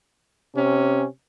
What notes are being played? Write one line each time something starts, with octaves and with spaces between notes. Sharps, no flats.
C3 C#4